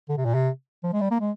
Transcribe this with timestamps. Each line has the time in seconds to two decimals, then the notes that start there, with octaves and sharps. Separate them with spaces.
0.09 D3
0.17 C3
0.25 A#2
0.34 C3
0.83 F3
0.93 G#3
1.01 G3
1.11 A#3
1.20 G#3